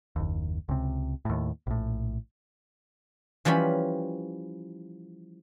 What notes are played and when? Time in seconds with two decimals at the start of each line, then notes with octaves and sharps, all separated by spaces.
0.16 F#1 D#2
0.69 C#2 C3
1.25 D#2 A2
1.67 A#1 A2
3.45 E3 F3 G3 C#4 B5